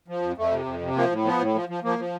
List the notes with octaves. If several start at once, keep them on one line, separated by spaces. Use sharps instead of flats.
F3
F2
F2 A3
C3
F2
C3
F3 A#3
A2
F3 B3
A2
F3
F3
F3 A#3
F3